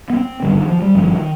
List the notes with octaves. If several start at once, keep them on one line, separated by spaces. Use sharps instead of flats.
B3
C4
G#1 G2 D3 G3
D#3
F3
G3
G#1 G2 D3 F3
D#3